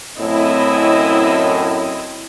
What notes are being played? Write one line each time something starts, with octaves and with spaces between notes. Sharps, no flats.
F#2 A2 C4 E4 D#5